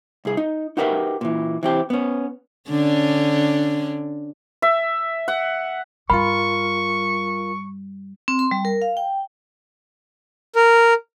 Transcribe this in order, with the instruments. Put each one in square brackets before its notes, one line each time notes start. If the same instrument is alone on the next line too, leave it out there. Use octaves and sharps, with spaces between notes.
[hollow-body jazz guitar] C2 G#4
D#4
D#4 F#4 G4 A#4 B4 E5
A#2 E3
E3 C4 G4
B3 C#4
[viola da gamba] D3 C#4 D4
[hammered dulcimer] E5
F#5
[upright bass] G2 G3 [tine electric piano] F4 A#4 [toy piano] B5 [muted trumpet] C#6
[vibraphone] C4
C6
G3
A#4
F5
G5
[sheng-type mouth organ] A#4